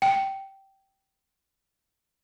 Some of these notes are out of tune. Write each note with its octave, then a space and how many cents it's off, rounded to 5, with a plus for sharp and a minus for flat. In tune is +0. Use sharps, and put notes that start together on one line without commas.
G5 -15